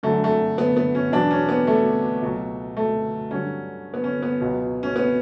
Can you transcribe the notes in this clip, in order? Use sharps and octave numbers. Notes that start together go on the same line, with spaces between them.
F#2 D3 F#3 A3
A3
B3
B3
C#4
E2 B2 F#3 D4
C#4
B3
A3
C#2 B2 F#3
A3
G2 D3 F#3 C#4
B3
C#4
B3
C#2 B2 F#3
C#4
B3